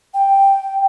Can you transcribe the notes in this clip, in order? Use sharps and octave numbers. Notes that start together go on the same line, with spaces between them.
G5